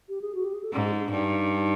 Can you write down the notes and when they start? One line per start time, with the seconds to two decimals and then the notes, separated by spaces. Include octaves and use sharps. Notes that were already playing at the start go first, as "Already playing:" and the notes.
0.09 G4
0.21 G#4
0.35 F#4
0.44 G4
0.54 G#4
0.64 A4
0.73 G#2 G#4
0.83 G#4
0.92 D#4
1.02 D4
1.11 G2 D#4